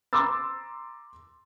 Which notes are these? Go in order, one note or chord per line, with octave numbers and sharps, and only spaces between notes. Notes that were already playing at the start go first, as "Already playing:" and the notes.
A#5 C6 D6 E6 A6